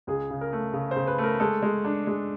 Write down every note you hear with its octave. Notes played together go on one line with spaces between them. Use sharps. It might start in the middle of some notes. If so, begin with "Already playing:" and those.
C#2 G#4
C#3
A#4
A3
C#3
C5
C#3
B4
A3
A#4
G#3 A4
G#3
D4
G#3